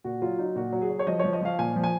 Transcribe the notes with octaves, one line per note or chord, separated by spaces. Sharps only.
A#2 F#4
F#3 F4
F#3 D#4
A#2 F#4
F#3
G#4
F#3
C#5
F3 D#5
F3 C#5
D#5
F3 F5
A#2 G#5
F3
G#5